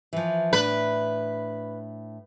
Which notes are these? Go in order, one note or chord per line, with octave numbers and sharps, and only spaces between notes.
E3 F3
A2 D4 B4